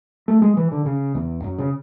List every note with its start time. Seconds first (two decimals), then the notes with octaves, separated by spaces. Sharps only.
0.28 A3
0.42 G#3
0.57 E3
0.72 D3
0.86 C#3
1.15 E2
1.44 F#2
1.58 C#3